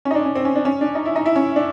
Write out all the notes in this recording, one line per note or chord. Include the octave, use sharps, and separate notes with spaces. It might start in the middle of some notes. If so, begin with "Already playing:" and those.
C#4
D#4
D4
C#4
C4
C#4
D4
C#4
D4
D#4
E4
D#4
E4
C#4
D4